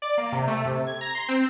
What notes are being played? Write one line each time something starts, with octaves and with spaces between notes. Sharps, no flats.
D5
A#3
C3
A3
C3
G#6
A#5
C6
C4